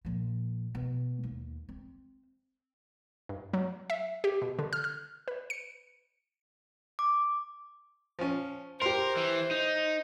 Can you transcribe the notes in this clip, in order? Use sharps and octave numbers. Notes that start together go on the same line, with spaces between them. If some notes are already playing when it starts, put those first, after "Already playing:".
A#2 F3
B2
D#2
C4
G2
F#3
E5
G4
B2
D3
F6
F6
B4
C#7
D6
F3 C#4
G4 A#4 C5 C6
E3
D#4